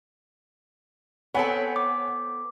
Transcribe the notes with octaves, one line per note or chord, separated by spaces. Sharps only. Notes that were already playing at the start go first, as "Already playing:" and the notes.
B3 C4 A4 C#5 F#5 G#5
D6